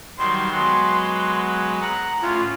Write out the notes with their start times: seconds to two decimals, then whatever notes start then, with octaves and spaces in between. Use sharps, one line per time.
0.18 D#3 F#3 G3 C6
0.50 F#3 G#3 B3
1.80 F#5 A#5
2.21 A2 C#4 F4